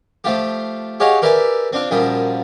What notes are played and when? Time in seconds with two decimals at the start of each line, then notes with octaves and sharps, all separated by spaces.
0.24 F3 A3 F4 G4
1.00 G4 G#4 C#5 D#5 F5 F#5
1.22 G4 A#4 B4 D5 E5 G#5
1.73 C4 D4 F4
1.91 F#2 A#2 F3 G3 D#6